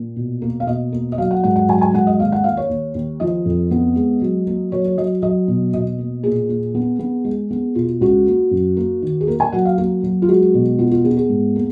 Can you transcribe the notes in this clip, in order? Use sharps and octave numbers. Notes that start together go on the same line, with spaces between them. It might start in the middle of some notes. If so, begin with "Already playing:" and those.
Already playing: A#2
B2
A#3
F5
B2 D#5
A#3
D#5
F#3 F5
F#5
G#2 F#5
F#5
F#3 G#5
G#5
G#2 F#5
D#5
D#2 F5
F#5
A#3 F5
C#5
D#2
D#2
F3 D#5
F2
B3
G#3
F#3
A#3
F#3 C#5
C#5
F#3 D#5
F#3 D#5
B2
B2 D#5
A#3
A#2 G#4
A#2
B3
B3
G#3
B3
B2 F4
C#2 F#4
A#3
F#2
A#3
D#3
G#4
A#3 A#4
G#5
F#3 F#5
F5
A#3 F#4
F#3
F4
G#3 F#4
B2
B3 F4
F4
B3 G#4
G#4
G#2
A#3